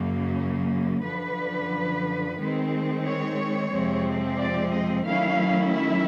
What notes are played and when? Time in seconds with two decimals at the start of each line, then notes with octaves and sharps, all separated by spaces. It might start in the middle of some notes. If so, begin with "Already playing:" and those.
Already playing: F#2 C#3 F#3 A#3
1.03 F#2 D3 F3 B4
2.38 D#3 G#3 C4
3.04 C#5
3.71 F2 C3 F3 G#3 C4
4.39 D5
4.73 D#5
5.05 D#3 F#3 A3 C#4 E4 F5
5.72 E5